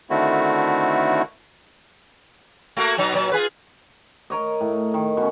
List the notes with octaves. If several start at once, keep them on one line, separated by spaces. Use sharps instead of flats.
D3 D#3 A3 C4 E4 F#4
A3 A#3 F#4
B2 F#3 D#4
A#2 F#3
F4 G#4 B4
A#4 C#5 D#5
A2
D#3
B2 C#4